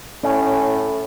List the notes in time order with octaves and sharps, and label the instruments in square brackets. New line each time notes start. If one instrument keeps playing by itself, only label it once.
[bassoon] A2 [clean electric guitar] C#4